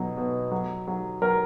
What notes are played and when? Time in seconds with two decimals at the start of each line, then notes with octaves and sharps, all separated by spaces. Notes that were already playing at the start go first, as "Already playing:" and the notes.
Already playing: B2 F#3
0.17 B2
0.51 F#3
0.87 F#3
1.22 F#3 A#4